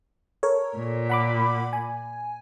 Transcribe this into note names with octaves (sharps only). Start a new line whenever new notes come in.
A4 A#4 C#5
A#2
F#5 B5 D6
G#5